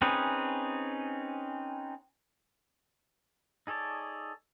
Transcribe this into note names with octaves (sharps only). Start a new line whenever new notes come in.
C4 C#4 D#4 G#4 B4
D#4 G#4 A4 C#5 D5